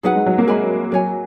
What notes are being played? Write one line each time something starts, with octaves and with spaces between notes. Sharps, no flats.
F#3 D#4 G#4 B4 F#5
G#3
F#3
A#3
G#3 A#4 E5 G#5 B5
F#3 A#4 C#5 G#5